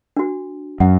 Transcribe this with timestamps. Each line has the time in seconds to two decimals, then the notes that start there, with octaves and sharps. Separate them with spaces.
0.17 D4 F#4
0.80 F#2 F#5